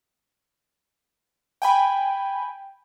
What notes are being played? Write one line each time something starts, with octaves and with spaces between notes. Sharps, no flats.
G5 G#5 B5